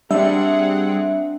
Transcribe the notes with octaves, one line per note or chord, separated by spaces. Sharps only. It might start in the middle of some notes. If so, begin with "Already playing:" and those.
G3 C4 D4 G#4 E5 F#5